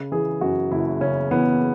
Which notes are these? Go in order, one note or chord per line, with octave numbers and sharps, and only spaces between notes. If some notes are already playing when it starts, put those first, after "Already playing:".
Already playing: C#3
E3 G#4
F#2 F#4
F#1 E4
C#3 C#4
E3 B3